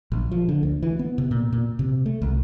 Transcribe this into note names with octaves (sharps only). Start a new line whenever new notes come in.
A#1
F3
D3
D2
E3
B3
C3
A#2
A#2
C3
A3
C2